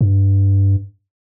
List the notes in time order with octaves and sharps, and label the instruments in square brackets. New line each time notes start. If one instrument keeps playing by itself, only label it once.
[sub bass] G2